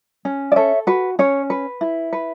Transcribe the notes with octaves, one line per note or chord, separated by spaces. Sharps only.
C#4
D5
A4 C#5 E5
F#4 B4
C#4 C#5
B4
E4
B4